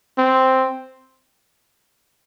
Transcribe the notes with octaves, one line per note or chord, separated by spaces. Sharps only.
C4